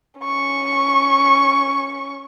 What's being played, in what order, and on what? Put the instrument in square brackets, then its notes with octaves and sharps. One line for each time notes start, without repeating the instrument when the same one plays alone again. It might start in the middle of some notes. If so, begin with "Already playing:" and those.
[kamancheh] C#4 C#6